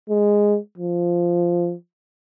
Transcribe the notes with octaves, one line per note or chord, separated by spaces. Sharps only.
G#3
F3